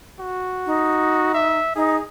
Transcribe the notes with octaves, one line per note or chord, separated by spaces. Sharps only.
F#4
D#4
E5
D#4 G#4